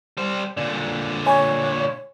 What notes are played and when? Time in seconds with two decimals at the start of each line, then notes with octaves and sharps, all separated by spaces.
0.17 G3 C5
0.57 A#2 D3 D5
1.26 C#5 D#5 G#5 B5